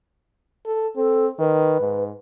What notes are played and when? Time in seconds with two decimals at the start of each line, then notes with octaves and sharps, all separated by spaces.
0.66 A4
0.96 C4 A4
1.39 D#3 B4
1.81 G#2